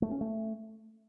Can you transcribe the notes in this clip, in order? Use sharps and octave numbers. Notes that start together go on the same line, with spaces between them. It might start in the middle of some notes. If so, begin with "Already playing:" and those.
A3
C#4
A3